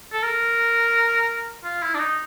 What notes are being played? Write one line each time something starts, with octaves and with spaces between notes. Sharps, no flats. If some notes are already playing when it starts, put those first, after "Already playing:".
A4
A#4
F4
E4
D4
D#4